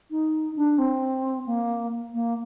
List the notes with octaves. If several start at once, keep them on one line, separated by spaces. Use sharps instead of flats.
D#4
D4
C4
A#3
A#3